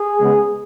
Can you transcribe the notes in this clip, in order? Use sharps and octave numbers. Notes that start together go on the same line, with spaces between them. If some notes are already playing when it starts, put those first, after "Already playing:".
Already playing: G#4
C#3 G#3 B3